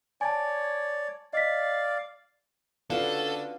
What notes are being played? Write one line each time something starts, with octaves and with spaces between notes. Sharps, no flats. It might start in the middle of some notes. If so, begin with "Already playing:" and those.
C#5 D5 G#5 A5
D5 D#5 F5 B6
D3 C#4 D4 F4 F#4 A4 B4 F5